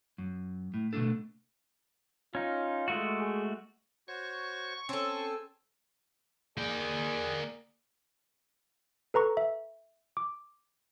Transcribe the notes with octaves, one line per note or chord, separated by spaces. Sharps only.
F#2
A2
B2 A3 A#3 C#4 D4 A4
C#4 D#4 F4
G#3 A3 F#4
G#4
F#4 C5 C#5 C#6
C4 C#4 A4 C#5 G#5 A5 E6
A#3 G#4 D5 G5
A4 B4 A#5 C#6
E5
D6